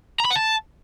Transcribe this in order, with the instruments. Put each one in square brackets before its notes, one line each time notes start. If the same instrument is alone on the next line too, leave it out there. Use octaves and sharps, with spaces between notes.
[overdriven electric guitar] A#5
B5
F#5
A5